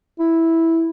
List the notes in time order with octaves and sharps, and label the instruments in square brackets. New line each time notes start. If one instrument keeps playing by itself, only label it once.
[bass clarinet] E4